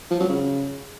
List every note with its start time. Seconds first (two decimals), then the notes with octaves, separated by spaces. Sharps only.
0.11 F3
0.20 F#3
0.29 C#3